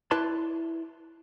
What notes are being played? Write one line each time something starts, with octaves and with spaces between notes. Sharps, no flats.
E4 B4 D5 A5 C6